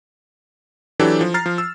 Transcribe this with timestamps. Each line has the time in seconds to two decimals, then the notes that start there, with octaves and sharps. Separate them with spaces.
1.00 E3 F#3 D4 G4 A4
1.21 F3
1.34 A#5 F6 A6 C7
1.46 F3
1.58 E6